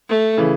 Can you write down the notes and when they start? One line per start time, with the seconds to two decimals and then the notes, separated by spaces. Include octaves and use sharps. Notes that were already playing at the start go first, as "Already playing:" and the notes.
0.08 A3
0.38 C#3 E3